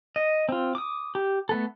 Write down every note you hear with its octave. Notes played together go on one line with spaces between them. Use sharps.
D#5
C4 F4
D6 D#6
G4
A3 B3 A4